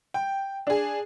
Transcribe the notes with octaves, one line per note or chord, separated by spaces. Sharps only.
G5
D4 G#4